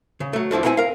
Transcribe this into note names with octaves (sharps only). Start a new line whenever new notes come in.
C#3
F#3 A3
E2 D3 F3 E4
B3 C4 E4 F#5 G#5
A#4 F5